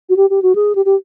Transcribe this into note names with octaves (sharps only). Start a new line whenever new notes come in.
F#4
G4
G4
F#4
G#4
G4
G4